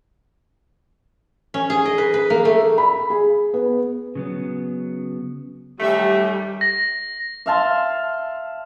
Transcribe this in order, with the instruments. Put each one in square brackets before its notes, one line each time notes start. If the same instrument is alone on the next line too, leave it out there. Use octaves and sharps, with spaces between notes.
[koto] C#4
G#4
D#5
B4
B4
A#3
A3
[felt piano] B5
G#4
B3
[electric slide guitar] C#3 F#3 B3
[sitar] F#2 D#3 E5 [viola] G3 [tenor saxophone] A3 [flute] G4
[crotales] A#6
[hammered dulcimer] E5 F5 A5 C6